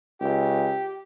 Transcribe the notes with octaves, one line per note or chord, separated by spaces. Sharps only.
C#2 G4